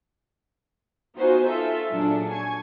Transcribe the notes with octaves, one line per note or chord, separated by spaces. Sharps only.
B3 D#4 F4 F#4 C5 G#5
F4 A4 E5
A#2 F#3 D4 G#4
G#5 C#6 G#6